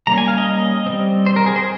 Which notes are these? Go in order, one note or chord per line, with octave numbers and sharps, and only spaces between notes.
G3 A#3 C#4 A#5
G#5
F5
D#5
G3 C4
C5
A#4
G#4
C5